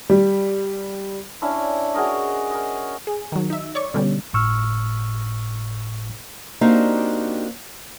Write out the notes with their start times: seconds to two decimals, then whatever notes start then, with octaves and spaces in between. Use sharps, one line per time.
0.10 G3
1.42 C#4 D4 E4
1.95 F#4 G#4 A#4 D#5
2.51 A#4 D#5
3.07 G#4
3.32 D#3 F#3
3.50 D#4 E5
3.75 C#5 D5 C#6
3.94 B2 D3 G3 C#4
4.33 G1 A2 C#6 E6 F6
6.61 A#3 C4 D4 D#4 F#4 G4